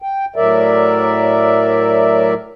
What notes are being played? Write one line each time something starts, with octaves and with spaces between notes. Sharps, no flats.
G5
A2 F#3 A#4 D5 E5